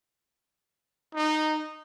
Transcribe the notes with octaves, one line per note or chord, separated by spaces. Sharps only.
D#4